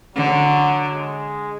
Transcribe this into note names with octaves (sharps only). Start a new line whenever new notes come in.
D3 F#3
G#3